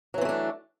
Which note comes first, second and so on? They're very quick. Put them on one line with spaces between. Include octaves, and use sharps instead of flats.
F#3 E3 C4 A3 D4